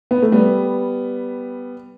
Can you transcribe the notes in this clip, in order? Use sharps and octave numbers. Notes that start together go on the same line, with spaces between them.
B3
A3
G3 B3